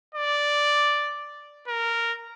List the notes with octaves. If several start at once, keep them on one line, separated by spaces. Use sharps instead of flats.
D5
A#4